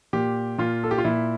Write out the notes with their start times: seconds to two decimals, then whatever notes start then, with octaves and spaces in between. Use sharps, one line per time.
0.13 A#2 G4
0.58 A#2 F4
0.84 A4
0.91 G4
0.98 F4
1.04 A#2 E4